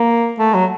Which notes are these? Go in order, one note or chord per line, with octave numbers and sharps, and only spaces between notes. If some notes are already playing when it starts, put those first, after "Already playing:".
Already playing: A#3
A3
F#3